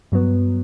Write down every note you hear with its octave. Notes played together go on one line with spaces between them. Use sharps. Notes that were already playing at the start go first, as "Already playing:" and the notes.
G2 F#3 B3